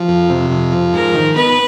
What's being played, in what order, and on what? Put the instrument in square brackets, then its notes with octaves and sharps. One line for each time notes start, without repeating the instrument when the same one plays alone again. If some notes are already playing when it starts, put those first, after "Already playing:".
Already playing: [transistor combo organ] F3
F2
C3
F2
F3
[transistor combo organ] G#2 [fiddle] A#4
[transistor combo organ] D#3
[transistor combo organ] B3 [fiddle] B4